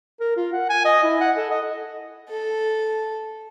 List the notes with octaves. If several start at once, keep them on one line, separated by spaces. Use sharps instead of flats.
A#4
F4
F#5
G#5
D#5
E4
F#5
A4
D#5
A4